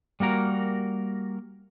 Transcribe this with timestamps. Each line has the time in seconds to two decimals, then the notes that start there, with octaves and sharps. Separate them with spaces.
0.20 G3 A#3 F#4 A#4